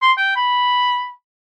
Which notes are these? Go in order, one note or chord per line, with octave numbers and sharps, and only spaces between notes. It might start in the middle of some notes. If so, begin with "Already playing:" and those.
C6
G5
B5